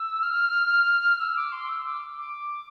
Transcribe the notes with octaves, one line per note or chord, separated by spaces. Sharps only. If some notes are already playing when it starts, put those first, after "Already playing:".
Already playing: E6
F6
E6
D6
C6
E6
D6
D6